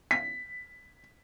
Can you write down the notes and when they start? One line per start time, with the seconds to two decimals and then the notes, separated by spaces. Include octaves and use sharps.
0.11 B6